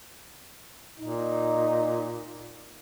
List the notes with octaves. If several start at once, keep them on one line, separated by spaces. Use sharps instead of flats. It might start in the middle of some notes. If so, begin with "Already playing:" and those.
A#2 D#4